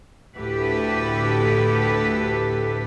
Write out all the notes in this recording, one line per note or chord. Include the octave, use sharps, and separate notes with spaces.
D2 A2 E4 G4 A4 B4